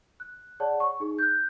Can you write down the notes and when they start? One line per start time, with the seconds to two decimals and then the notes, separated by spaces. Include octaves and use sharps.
0.20 F#6
0.60 G#4 C#5 D5 F#5 A5
0.80 C#6
1.00 D#4 G#4
1.19 F#6 G6